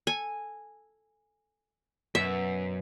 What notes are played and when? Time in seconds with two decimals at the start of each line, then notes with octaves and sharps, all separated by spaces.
0.07 A4 G#5
2.15 F#2 B2 E5